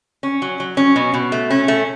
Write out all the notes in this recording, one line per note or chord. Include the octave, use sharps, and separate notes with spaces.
C#4
F#3
F#3
C#4
B2
B2
A3
C#4
A3